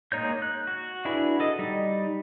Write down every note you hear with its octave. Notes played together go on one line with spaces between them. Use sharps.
G#3 A#3 D#4 C#5 G6
F#6
F#4
D4 E4 F#4 G#4 B4
A4 D#5
G3 D#4